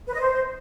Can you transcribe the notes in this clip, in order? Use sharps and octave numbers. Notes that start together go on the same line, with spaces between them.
B4
D#5
C5